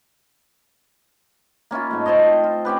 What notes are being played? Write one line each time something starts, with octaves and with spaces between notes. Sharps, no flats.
A#3 C#4 E4 F4
G#2 A3
A4 C5 C#5 D#5
C4
F4
C4 C#4 G4 B4